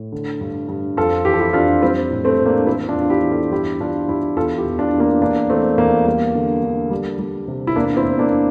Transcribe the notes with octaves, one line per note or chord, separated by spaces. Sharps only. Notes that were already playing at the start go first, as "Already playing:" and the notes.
Already playing: A2
D3
G2
G2
F2 F4 A4
E3 G4
A4
E4 G4
F2 D4 F4
G3 C4 E4
A2
A3 C4
A2
A#3 D4
E3 C4 E4
D4 F4
E2
F4
E4 G4
E3
F4 A4
G2 E4 G4
G2 D4 F4
G2 E4 G4
E2 F4 A4
E4 G4
E2
D4 F4
E2
A#3 D4
E2 A#3 D4
E3 A3 C4
E2 A#3
G3 A#3
D3
D3
G3
G3
C3
E4
E2 A#3 D4
C4 E4
E2
A#3 D4